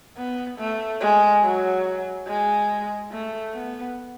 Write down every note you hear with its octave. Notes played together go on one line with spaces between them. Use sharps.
B3
A3
G#3
F#3
G#3
A3
B3